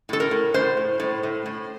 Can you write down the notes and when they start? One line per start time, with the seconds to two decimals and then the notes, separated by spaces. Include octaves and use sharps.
0.09 A2 A4
0.20 A#4
0.31 A2
0.54 A2 C5
0.77 A2
1.00 A2
1.23 A2
1.46 A2